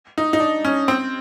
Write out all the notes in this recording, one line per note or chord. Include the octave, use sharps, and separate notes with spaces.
D#4
D#4
D4
C#4
C4